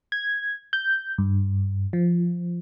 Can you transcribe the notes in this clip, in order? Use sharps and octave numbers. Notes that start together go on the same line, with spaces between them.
G#6
G6
G2
F3